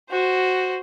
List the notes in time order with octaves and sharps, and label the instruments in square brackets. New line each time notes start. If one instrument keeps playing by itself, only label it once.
[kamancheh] F#4 C5